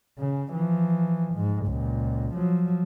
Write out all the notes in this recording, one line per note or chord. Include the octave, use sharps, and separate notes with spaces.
C#3
E3 F3
G#2
C#2 A#2
F3 F#3